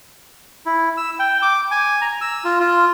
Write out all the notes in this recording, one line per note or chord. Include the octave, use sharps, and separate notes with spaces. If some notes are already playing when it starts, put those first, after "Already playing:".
E4
E6
G5
D6
G#5
A#5
E6
F4
F4